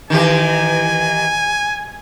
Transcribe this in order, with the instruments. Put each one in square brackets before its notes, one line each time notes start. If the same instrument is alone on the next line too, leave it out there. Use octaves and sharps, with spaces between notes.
[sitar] D#3 E3 G4 [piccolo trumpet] G#5